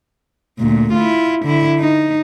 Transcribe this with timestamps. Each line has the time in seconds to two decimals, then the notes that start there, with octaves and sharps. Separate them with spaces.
0.59 D2 A#2
0.94 E4 F4
1.45 D3 E4
1.80 D#4